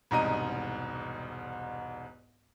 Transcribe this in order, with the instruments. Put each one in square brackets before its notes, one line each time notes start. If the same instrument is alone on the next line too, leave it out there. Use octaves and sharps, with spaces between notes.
[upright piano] E1 C2 G#2 D#5 A#5 D#7